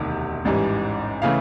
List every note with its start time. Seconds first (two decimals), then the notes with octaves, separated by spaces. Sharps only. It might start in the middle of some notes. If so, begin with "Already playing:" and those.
Already playing: E1 D2 C3 D#3
0.45 A1 G#2 E3 G3
1.22 C#3 E3 A3 F5